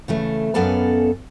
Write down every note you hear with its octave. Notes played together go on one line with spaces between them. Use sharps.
C#3 E3 A3
F#2 B3 C#4 A4 D5 F5